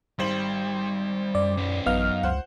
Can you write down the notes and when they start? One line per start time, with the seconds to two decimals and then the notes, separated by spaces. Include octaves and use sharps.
0.19 G#1 G3 C5 F#7
1.35 F#2 D5
1.57 C#4 B4
1.86 A1 F#2 B3 D#4 F5 F6
2.23 C#2 C5 F#5